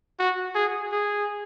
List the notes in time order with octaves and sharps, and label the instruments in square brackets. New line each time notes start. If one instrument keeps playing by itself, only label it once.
[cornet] F#4
G#4
G#4